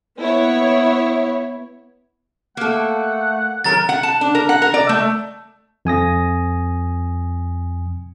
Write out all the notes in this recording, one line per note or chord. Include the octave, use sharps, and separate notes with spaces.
B3 E4 C#5
A3 A#3 A4 F#5
D#3 F#3 A4 A#4 A#5 A6
F#5
A5
D4
A#4
F#5
A#4
D5
A3
F2 G#5 D#6 A#6